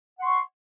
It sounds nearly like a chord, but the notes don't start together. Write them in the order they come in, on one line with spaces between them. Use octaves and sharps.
F#5 C6 C#6